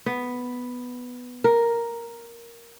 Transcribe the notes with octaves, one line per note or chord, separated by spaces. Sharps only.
B3
A#4